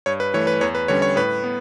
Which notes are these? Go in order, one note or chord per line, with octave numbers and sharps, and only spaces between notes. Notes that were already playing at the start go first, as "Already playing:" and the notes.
G2 C#5
B4
E3 A3 C#5
B4
E2 C#5
B4
D3 G3 C#4 C#5
C#5
A2 B4
B3